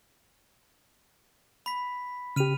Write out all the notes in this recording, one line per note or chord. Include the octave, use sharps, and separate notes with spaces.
B5 B6
C#3 G4 F6 D#7 F7